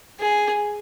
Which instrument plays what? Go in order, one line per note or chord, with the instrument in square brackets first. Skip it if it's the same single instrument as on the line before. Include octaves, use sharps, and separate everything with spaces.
[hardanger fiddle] G#4